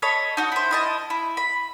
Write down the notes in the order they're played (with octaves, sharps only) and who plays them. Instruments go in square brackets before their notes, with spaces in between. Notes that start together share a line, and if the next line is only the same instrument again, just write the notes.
[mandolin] A4 C#5 D#5 B5
D#4 F#4
E4 C5
E4 D#5 A5
E4
B5